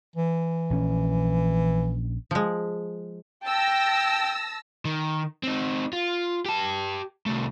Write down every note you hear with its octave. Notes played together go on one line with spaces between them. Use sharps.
E3
A#1 C#4
F3 G#3
G5 A5 E6 A#6
D#3
C4 D#4
F4
G4 A5
C2 A3